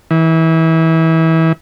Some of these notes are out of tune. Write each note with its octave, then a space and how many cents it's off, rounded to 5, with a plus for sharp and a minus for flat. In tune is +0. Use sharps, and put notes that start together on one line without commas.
E3 -30